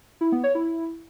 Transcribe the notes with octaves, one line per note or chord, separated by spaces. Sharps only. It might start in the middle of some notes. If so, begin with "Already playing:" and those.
E4
B3
C#5
E4